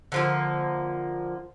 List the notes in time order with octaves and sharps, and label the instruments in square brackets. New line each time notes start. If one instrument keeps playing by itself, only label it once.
[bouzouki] D3 F3 A#3